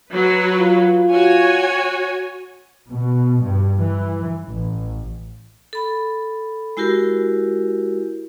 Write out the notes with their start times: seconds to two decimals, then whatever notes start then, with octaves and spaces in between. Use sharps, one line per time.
0.12 F#3 B4
0.60 F4
1.10 F#4 C#5 G#5
2.90 B2
3.41 G2
3.80 E3
4.47 A1
5.73 A4 B5
6.77 G#3 E4 F#4 G4 A#4